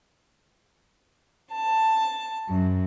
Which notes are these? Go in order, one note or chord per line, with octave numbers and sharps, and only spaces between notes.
A5
F#2